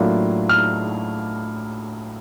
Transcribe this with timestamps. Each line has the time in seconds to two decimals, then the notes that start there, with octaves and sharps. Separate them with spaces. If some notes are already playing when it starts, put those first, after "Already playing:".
Already playing: A2 F#3 A#3 D4 F4
0.49 F6